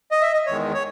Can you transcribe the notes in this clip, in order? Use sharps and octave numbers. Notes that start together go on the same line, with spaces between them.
D#5
E5
D#5
E2 D#3 G#3 C#5
C#5